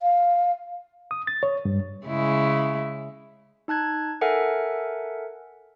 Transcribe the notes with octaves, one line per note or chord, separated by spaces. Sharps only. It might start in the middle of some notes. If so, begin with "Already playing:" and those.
F5
D#6
A6
C#5
G2
C#3 G#3 E4
D#4 A5 F#6 G#6
A4 A#4 E5 F#5 G#5